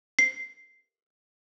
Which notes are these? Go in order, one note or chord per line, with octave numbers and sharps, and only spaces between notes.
C7